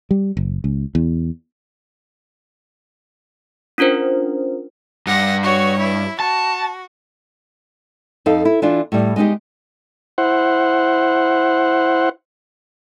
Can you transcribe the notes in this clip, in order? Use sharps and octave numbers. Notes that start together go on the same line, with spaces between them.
G3
F#1
C#2
E2
C#4 D4 F4 A#4 C5
G2 F#5 A#6
F#4 C#5
E4
F#4 A5
F2 D#4 A4 F5
E4
E3 D4 F4
A2 G3
G#3 B3 D4 D#4 G4
E4 C5 F#5